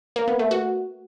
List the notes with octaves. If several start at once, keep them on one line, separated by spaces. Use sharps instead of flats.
A#3
B3
A3
F#4